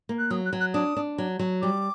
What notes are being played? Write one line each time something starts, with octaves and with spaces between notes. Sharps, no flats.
A#3
F#6
F#3 D#6
F#6
F#3
F#6
D4 D#6
D4
F#3
F#3
G3 D6